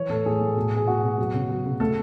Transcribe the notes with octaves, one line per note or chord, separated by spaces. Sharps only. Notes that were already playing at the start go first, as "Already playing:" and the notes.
Already playing: E3 C#5
A2 A4
A2 G#4
A2
B2
B2 G#4
B2 F#4
B2
F#3
C#3
F#3
C#3
A3 A4